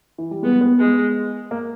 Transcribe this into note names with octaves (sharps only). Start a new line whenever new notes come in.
E3
G3
G#3 B3
B3
G#3
A#3